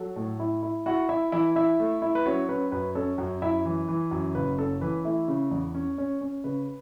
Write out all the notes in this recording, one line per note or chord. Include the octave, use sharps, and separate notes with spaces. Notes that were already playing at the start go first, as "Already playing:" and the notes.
Already playing: F#3 A4
A2
E4
E4
E4 F#4 F#5
E4 E5
E3 E4 E5
E4 E5
A3
E4
B4
F#3 C#4 C#5
C#4 B4
F#2 B4
C#4 A4
F#2
F#2 E4 E5
E3
E3
F#2
F#1 B4
C#4 A4
E3 B4
A3 E4 E5
C#3
E2
C#4 C#5
C#4
C#4
C#3 B4